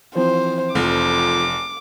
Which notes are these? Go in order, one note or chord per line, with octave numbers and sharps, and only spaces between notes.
E3 F3 C4 C5
F1 F2 D6